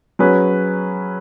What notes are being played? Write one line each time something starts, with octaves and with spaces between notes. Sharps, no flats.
F#3 C#4 G#4 B4